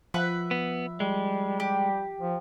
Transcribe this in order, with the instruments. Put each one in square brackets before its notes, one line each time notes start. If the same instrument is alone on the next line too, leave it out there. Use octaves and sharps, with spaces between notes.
[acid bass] F3 [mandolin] B4 E5 F#5
[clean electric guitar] B3
[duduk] G3 [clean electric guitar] G#3
[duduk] G3 [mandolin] G4
[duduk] F3